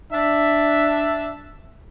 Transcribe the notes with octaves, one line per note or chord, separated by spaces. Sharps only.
D4 E5